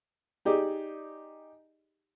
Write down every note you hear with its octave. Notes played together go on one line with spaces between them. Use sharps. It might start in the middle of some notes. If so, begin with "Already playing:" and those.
D#4 G4 G#4 D5